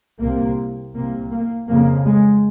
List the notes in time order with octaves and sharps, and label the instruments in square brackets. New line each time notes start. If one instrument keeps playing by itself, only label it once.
[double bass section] C2 C3 A#3
C2 C3 A#3
A#3
F2 C#3 A#3
G#3